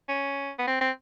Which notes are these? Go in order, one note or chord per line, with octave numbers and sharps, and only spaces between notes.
C#4
B3
C4
C4